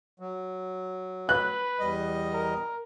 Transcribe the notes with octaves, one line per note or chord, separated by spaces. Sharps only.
F#3
B4 F#6
E2 G3 D#5
A#4